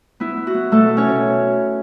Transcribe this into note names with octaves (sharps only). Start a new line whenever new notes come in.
B3 E4
B3
F#4
B3
B2 A3 A4
B3
C#4 C#5
B2